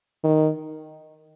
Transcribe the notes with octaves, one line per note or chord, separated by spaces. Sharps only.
D#3